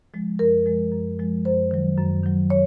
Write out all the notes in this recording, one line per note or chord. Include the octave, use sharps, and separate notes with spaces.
F3 G#3
F#2 A#4
F3 G#3
F#2
F3 G#3
F#2 C5
D#3 F#3
F#2
D#3 F#3
C#5